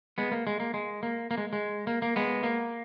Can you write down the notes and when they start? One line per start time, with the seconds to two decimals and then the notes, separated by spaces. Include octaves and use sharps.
0.18 G#3 B3
0.32 A#3
0.47 G#3
0.60 A#3
0.74 G#3
1.03 A#3
1.31 A#3
1.38 G#3
1.53 G#3
1.87 A#3
2.02 A#3
2.16 G#3 B3
2.44 A#3